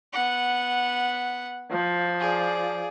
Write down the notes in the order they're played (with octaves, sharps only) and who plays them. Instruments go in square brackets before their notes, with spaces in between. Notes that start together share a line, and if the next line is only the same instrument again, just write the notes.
[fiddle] B3 F#5
[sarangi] F3
[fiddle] G#4 D5